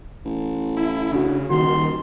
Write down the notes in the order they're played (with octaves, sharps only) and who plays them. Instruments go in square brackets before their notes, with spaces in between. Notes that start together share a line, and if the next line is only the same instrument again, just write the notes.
[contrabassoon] A1
[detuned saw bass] E4
[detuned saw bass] C#3 [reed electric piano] D4 F#4
[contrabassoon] D#1 [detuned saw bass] D#3 [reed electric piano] F#4 [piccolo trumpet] C6